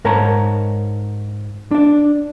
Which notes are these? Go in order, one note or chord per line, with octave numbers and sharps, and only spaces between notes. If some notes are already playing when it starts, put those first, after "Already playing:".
G#2 A#4 C#5 A5 A#5
D4 D5